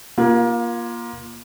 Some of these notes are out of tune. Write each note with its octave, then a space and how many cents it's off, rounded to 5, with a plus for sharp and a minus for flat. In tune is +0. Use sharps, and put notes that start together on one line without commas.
A#3 +25 F4 -5